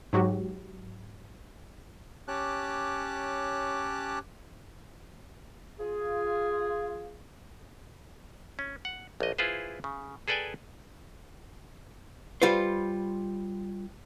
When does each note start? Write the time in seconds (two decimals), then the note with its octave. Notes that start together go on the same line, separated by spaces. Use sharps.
0.13 G#2 F#3 F#4 G4
2.28 C#4 G4 C#5 A5 D6 F#6
5.80 F4 G#4
8.59 C#4
8.85 F#5
9.20 A#1 D#5
9.38 E4 F4 G#4 B4 C5
9.84 C#3
10.28 G#4 A4 B4 D5 G5 G#5
12.42 G3 F4 B4 C5